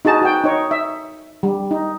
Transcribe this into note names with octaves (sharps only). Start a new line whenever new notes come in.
D#4 F#4 G#4 A5
F#4 G5
D#4 C#5
E5
G3
D#4